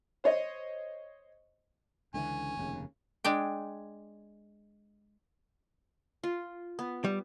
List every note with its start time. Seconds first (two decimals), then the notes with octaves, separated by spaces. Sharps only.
0.24 C5 C#5 D#5
2.14 C#2 D3 E3 C#4
2.57 F1 D#2 C#3
3.24 G#3 D4 G5
6.23 F4
6.79 B3
7.04 G3